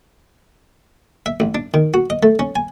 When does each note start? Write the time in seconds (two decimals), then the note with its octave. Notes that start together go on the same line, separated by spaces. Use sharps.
1.26 E5
1.40 A1
1.55 D4
1.74 D#3
1.94 F#4
2.10 D#5
2.23 A3
2.39 C#4
2.56 G#5